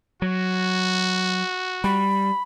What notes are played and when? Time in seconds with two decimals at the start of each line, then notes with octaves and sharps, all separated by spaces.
0.22 F#3 F#4
1.84 G3 B5